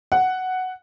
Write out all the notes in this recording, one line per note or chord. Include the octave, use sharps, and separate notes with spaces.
F#5